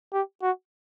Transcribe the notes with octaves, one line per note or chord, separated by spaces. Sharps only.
G4
F#4